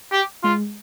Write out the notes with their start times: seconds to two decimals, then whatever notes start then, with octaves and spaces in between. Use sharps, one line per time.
0.12 G4
0.44 G#3 F4